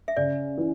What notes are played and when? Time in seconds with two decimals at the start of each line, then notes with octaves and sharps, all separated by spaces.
0.08 E5
0.17 C#3 D5
0.58 E3